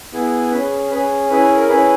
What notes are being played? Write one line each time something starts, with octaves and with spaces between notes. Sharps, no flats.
B3 E4 G#4
C#4 G#4 B4
C#4 G#4 B4
C#4 E4 G#4 B4
A#4
C#4 E4 G#4 B4